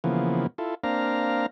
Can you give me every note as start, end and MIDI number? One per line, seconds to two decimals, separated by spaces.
0.04 0.47 49
0.04 0.47 52
0.04 0.47 53
0.04 0.47 58
0.04 0.47 59
0.58 0.75 64
0.58 0.75 65
0.58 0.75 69
0.84 1.46 58
0.84 1.46 60
0.84 1.46 62
0.84 1.46 77
0.84 1.46 82